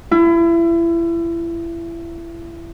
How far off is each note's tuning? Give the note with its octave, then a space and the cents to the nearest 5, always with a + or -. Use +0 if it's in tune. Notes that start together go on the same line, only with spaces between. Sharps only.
E4 +30